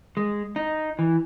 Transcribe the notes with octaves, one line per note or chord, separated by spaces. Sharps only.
G#3
D#4
E3